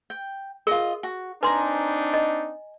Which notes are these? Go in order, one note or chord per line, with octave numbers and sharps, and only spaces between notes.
G5
F4 G#4 A#4 D#5
F#4
C4 D4 D#4 B4 G#5 A#5 C6
D#5